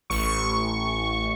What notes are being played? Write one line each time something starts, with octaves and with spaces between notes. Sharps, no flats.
A1 C#6